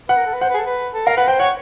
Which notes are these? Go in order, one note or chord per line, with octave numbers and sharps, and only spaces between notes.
B4 F#5
A#4
A4
B4
C5 F#5
B4
G#4
A4
B4
A4
A#4 F5
B4 F#5
C5 G5
C#5 F#5